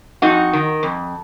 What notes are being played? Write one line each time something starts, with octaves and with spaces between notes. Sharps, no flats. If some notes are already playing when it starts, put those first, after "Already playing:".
F2 D#4 F#4
D#3
F2